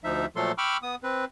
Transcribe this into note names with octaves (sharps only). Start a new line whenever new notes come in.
D2 F3 D#4 E5
A#2 F3 F#3 A3 A4 C6
G5 B5 C#6 D6 E6 F6
B3 D#6
C4 B4